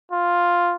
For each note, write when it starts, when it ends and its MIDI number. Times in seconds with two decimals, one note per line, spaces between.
0.12 0.76 65